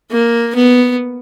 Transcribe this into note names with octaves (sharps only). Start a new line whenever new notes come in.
A#3
B3